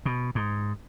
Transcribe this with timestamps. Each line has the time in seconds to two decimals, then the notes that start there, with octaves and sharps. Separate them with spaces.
0.05 B2
0.35 G#2